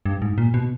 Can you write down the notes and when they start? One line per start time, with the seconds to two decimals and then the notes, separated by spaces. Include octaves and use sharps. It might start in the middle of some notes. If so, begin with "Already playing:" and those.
0.06 G2
0.22 G#2
0.38 A#2
0.54 B2